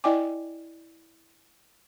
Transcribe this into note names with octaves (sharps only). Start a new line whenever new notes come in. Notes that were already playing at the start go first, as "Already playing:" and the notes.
E4 D5 D#5 G5 G#5 D6